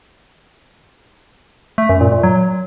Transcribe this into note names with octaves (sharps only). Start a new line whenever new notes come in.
A3
F#2
A#2
A#2
F#3